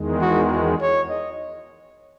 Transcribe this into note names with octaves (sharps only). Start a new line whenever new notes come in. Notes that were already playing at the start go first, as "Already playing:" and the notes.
Already playing: E2 D#3 G#3
F#4
F#4
C#5
D#5